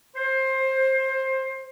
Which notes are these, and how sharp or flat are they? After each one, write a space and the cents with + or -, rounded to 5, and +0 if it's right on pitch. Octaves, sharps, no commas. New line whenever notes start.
C5 +20